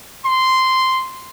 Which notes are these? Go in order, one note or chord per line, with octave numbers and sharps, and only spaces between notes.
C6